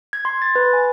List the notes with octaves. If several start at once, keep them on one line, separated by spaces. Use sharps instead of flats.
G#6
C6
A6
B4
G#5